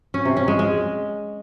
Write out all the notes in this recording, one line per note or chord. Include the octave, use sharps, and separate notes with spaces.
C#4
C3
C#4
G#3
G#3